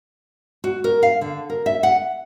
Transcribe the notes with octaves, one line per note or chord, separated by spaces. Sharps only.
F#4
A#4
F5
D3
A#4
E5
F#5